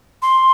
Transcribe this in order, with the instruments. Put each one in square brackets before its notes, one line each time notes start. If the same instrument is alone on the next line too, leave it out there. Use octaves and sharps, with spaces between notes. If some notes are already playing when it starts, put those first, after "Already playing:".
[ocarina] C6